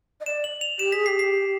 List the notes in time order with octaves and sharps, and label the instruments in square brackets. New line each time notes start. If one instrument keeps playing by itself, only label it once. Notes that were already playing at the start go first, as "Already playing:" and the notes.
[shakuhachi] D#5
[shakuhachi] D5 [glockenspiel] E7
[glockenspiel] F#7
F7
[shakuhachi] G4 [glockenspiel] E7
[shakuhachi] G#4 [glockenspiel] B6
[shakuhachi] G4 [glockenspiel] C7
[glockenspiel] C7